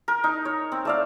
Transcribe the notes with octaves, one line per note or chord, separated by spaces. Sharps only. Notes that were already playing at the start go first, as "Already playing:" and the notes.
A#4
D#4
C#5
C4
A3 D5 F5